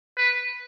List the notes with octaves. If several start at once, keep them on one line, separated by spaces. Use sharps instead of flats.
B4